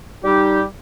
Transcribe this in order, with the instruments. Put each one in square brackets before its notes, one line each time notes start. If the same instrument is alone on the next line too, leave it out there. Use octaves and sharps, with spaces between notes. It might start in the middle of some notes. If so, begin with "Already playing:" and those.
[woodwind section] G3 D#4 G4